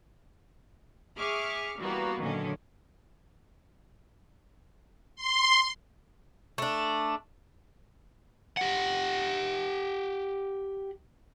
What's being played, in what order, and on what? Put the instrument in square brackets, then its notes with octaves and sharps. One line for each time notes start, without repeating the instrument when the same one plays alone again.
[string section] G#4 E5 C#6 D6 F6
E3 G3 A#3 B3 F#4
F#2 A#2 D3 D#3 C#4
[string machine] C6
[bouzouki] A3 D4
[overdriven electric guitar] G4 F#5